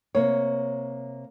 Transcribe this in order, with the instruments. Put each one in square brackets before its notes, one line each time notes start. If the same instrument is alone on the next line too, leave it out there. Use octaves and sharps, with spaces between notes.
[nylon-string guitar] C3 A#3 C#5